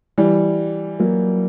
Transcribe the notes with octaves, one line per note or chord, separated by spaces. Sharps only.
E3 G3
F#3 A#3